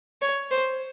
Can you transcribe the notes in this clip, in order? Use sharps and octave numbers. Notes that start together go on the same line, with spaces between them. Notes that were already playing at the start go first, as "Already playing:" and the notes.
C#5
C5